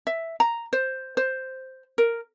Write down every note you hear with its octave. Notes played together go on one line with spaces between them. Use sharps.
E5
A#5
C5
C5
A#4